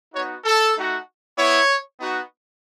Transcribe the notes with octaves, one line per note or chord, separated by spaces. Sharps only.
B3 D#4 F#4 C#5
A4
A3 D#4 F#4
B3 E4 C#5
B3 D#4 F#4